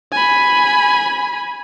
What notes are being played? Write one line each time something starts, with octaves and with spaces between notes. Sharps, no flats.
G#5 B5